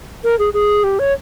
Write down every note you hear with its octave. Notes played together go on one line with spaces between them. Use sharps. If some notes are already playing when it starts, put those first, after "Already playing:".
A#4
G#4
G#4
G4
C#5